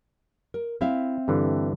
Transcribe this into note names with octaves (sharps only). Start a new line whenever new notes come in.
A#4
C4 E4 E5 F5
G2 D3 E3